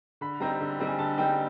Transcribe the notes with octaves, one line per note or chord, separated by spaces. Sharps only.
D3 B5
G3 C4 D#4 A#5
D3
G3 C4 D#4
G#5
D3 A5
G3 C4 D#4 G5